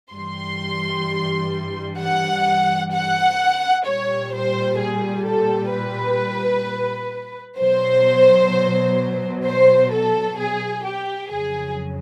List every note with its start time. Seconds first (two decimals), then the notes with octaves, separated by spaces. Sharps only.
0.12 G2 E3 G3 C6
1.98 F#5
2.92 F#5
3.85 A#2 G3 C#5
4.32 C5
4.79 G#4
5.25 A4
5.71 B4
7.59 B2 F#3 C5
9.45 C5
9.92 A4
10.38 G#4
10.85 G4
11.31 F2 C#3 F#3 G#4